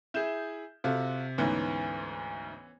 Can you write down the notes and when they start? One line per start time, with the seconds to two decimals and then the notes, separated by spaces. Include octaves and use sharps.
0.14 E4 G#4 G6 E7
0.84 C3 F4 F#4 A4
1.38 D2 G#2 E3 B3 C#4